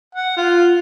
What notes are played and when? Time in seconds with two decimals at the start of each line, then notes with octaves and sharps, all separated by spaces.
0.15 F#5
0.37 F4